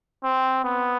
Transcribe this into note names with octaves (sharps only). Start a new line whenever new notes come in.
C4
B3